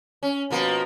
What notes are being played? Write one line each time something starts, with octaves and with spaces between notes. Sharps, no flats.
C#4
B2 F3 A#3